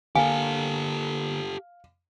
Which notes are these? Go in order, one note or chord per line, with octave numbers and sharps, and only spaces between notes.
D3 A#3 G4 A4 F5 G#5